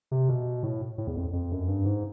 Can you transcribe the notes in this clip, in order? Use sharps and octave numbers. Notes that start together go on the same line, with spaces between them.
C3
B2
A2
A2
E2
F2
F2
F#2
G2
G#2